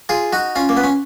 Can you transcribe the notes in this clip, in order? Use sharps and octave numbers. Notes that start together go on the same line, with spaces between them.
F4 G#4
D#4 F#4
C#4 F4
A#3
B3
C#4